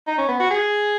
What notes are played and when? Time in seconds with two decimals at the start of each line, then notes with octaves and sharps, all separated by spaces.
0.07 D#4
0.18 C#4
0.28 B3
0.40 F#4
0.51 G#4